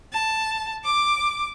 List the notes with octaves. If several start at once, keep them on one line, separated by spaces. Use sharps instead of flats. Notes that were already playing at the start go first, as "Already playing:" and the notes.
A5
D6